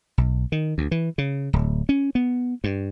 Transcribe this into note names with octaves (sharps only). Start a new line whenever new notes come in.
B1
D#3
D2
E3
C#3
D1
C#4
B3
G2